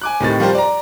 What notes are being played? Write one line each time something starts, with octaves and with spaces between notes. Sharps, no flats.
G#5 D6 F#6
A2 C3 D#3 A6
F3 G3 A#4 C5
D5 A#5